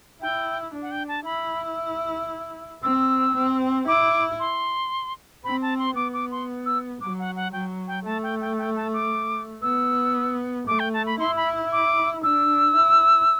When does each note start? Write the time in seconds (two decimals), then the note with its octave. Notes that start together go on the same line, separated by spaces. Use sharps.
0.21 E4 G5
0.73 D4
0.82 F#5
0.91 G5
1.08 A5
1.25 E4 B5
2.83 C4 E6
3.34 C4
3.88 E4 D6
4.40 C6
5.44 C4 B5
5.62 A5
5.79 C6
5.96 B3 D6
6.13 D6
6.31 C6
6.66 E6
7.01 F#3 D6
7.19 F#5
7.36 F#5
7.53 F#3 G5
7.88 G5
8.05 A3 A5
8.23 G5
8.41 G5
8.58 G5
8.76 A5
8.93 D6
9.62 B3 E6
10.67 A3 D6
10.80 G5
10.93 A5
11.06 B5
11.19 E4 C6
11.37 B5
11.72 D6
12.23 D4 E6
12.76 E4